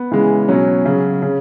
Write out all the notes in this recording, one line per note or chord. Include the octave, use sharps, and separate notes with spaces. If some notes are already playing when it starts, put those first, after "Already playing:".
Already playing: B3
C#3 E3 G#3
B2 F#3 C#4
C#3 F#3
C#3